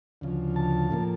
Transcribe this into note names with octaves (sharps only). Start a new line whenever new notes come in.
D2 C#3 F3
A5
A2 F3 A#3